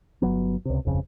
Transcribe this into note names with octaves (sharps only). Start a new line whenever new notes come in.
G1 F#3 B3
C#2 C3
D1 G1 F2 C#3